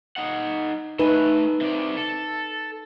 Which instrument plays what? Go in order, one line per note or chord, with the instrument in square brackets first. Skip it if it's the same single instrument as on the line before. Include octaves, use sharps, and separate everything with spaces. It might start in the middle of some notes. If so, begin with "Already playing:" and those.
[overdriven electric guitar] D#4 F#5
[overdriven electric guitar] A3 G#5 [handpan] D#4 B4
[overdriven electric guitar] C3 D5
A4